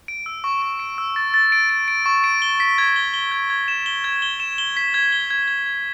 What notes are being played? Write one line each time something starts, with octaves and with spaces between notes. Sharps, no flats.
D7
E6
C#6
C#6
D7
E6
A6
A6
D7
D7
D7
C#6
D7
G7
B6
G#6
G7
G7
G#6
G#6
E7
G7
G#6
G7
E7
G7
B6
G#6
G7
G#6
G#6
G#6